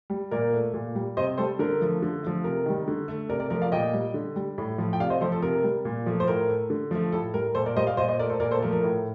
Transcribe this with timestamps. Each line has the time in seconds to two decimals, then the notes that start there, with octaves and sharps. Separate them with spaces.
0.10 G3
0.31 A#2 A#4 D5
0.53 A3
0.74 A#2
0.95 G3
1.17 C3 C5 D#5
1.38 G3 A4 C5
1.59 D3 A#4
1.81 F3 A3
2.02 D3
2.23 F3 A3
2.44 C3 A#4
2.66 D#3 G3
2.88 D3
3.08 A3
3.29 C3 A#4 D5
3.40 A#4 D5
3.50 F3 A3 A#4 D5
3.61 D5 F5
3.72 A#2 D#5 G5
3.93 G3
4.14 D3
4.36 G3
4.58 A2
4.78 F3 A3
4.93 G5
5.00 C3 D5 F5
5.10 C5 D#5
5.21 F3 A4 C5
5.25 A3
5.32 A4
5.42 C3 A#4
5.64 G3
5.85 A#2
6.06 F3 A3
6.20 C5
6.28 A2 A#4
6.49 A3
6.70 D3
6.91 F3 A3
7.12 A2 A4
7.34 G3 A#4
7.55 A#2 A4 C5
7.66 A#4 D5
7.76 G3 C5 D#5
7.87 D5 F5
7.97 A#2 C5 D#5
8.08 C5 D#5
8.19 A3 A#4 D5
8.30 A4 C5
8.40 A#2 A#4 D5
8.51 A4 C5
8.62 F3 A3 A#4
8.72 A#4
8.83 A2